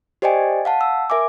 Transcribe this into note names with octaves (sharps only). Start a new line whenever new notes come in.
G4 C5 D5 D#5 G5 G#5
F5 F#5 A5
E6
A#4 E5 G#5 D6